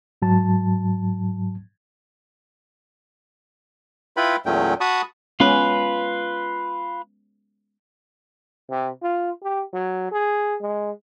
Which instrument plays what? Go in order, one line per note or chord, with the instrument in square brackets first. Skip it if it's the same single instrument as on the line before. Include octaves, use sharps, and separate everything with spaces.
[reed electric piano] G#2 F#3 A5
[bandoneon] E4 F4 B4 G5 B5
E2 A#2 F#3 A3 C#4 G5
F#4 A5 B5 C#6 D#6
[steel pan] G#3 B3 C#4 [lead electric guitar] F4 B4
[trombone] C3
F4
G4
F#3
G#4
G#3